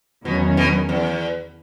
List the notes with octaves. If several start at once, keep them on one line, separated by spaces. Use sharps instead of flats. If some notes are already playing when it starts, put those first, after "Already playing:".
E2 B2 D#3 F#3 C#4
B2
E2